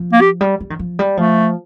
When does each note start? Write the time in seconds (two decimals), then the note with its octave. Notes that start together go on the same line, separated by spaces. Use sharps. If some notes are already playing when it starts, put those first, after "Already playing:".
Already playing: F3
0.12 A#3
0.21 G4
0.41 G3
0.60 G3
0.70 D#3
0.79 F3
0.99 G3
1.17 F3 A3